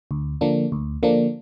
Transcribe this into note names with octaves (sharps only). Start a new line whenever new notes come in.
D2
D3 F3 A#3 D4
D2
D3 F3 A#3 D4